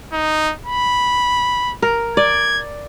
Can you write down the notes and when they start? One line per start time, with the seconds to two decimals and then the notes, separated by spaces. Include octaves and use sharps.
0.13 D#4
0.66 B5
1.82 A#4
2.17 D5 G#6